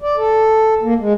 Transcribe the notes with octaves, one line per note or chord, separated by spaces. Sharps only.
D5
A4
A#3
G#3